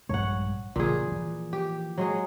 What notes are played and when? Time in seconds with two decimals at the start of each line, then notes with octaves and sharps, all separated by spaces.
0.09 A#1 G2 G#3 C#5 F#5
0.76 A1 A#2 C#3 E3 G#4
1.08 E3 F3
1.53 G4
1.98 F#3 G#3 G#4